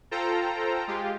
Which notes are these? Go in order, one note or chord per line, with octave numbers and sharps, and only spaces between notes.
F4 A4 C5 G5 A#5
G#3 F4 G4